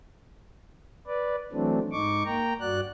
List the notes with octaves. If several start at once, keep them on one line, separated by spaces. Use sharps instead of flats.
B4 D5
E3 F#3 A3 C4 D4
G#2 D#4 C#6 D6
A#3 G5 A#5
G2 F#4 D5 F#6